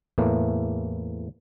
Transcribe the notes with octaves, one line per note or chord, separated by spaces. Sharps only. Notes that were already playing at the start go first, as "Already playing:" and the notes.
E2 A2 E3 A3 A#3